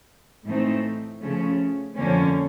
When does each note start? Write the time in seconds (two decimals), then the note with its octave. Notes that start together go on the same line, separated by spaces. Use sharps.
0.46 A2 E3 A3 C4 D#4
1.21 C#3 F3 A3 C#4
1.96 F2 D3 F3 A#3 C#4